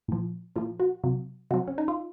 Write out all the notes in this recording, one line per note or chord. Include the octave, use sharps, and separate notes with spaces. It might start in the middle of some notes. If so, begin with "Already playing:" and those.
A#2 F3
A#2 F3 F4
F#4
C3 F#3
C3 F#3 F#4
C#4
D#4
F4